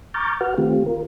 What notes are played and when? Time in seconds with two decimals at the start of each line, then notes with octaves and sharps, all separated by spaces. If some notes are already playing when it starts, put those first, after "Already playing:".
0.14 A#5 C#6 D6 F6 G6 A6
0.41 F#4 B4 F#5 F6
0.58 D#3 A3 C4 F4 G4
0.86 F4 A#4